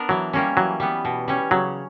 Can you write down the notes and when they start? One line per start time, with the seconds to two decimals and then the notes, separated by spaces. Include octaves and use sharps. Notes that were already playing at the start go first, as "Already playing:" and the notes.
Already playing: B3 D4 A#4
0.09 E3 F#3
0.33 G3 A#3 C#4
0.57 E3 F#3
0.80 G3 B3
1.05 B2
1.28 G3 C#4
1.51 C#3 F#3